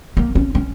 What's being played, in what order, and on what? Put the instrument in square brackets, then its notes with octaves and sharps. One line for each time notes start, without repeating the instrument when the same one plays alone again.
[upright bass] A#3
C#4
C#4